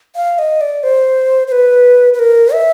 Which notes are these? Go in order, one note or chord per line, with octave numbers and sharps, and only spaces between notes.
F5
D#5
D5
C5
C5
B4
B4
A#4
E5